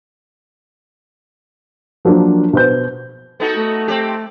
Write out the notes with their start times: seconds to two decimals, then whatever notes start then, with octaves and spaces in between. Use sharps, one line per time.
2.05 F3 F#3 A#3 D4
2.53 B2 C5 G6
3.40 B3 D#4 F#4 A4
3.56 A3
3.88 C4 G4